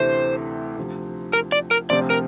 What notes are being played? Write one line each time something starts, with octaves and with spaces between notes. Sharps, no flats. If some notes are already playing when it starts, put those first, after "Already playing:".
Already playing: D2 C3 E3 A3 C4 C5
D2 C3 F3
A#4
D5
A#4
D2 C3 F3 C4 F4 D5
A#4